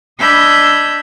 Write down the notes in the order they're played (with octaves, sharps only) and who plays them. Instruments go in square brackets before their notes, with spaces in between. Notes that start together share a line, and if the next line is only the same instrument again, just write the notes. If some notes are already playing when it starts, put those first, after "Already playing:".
[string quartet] D4 D#5 B5 E6 G6 G#6